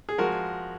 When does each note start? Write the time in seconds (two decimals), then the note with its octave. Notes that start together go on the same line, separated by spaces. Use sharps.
0.09 G#4
0.18 F3 G#3 F#4 A#4